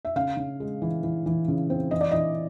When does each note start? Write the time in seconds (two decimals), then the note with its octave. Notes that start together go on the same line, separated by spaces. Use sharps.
0.05 E5
0.16 C#3 F5
0.37 C#3
0.60 G#3
0.82 E3
1.03 E3
1.26 E3
1.48 C#3
1.70 C4
1.91 E3 D#5
2.01 D5
2.11 E3 D#5